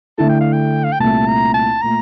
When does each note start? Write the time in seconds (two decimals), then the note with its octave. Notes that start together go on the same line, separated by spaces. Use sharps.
0.18 D3 A3 E4 A4 A5
0.29 G5
0.41 F5
0.53 G5
0.84 F5
0.92 G5
1.00 C2 A#2 A3 A5
1.27 A#5
1.54 A5
1.82 A#2 A3 A#5